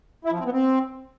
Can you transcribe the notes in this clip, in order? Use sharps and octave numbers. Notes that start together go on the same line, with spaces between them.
E4
F3
C4
B3
C4